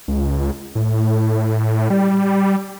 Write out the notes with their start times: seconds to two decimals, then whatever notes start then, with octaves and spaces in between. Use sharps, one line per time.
0.08 C#2
0.75 A2
1.90 G3